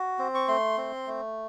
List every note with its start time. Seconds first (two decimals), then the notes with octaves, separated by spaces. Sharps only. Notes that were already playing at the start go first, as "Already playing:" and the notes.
Already playing: F#4
0.19 C4
0.35 C#6
0.48 A3 C6
0.77 C4
1.07 A3